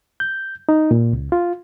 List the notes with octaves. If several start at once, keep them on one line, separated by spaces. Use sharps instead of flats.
G6
D#4
A#2
C#2
F4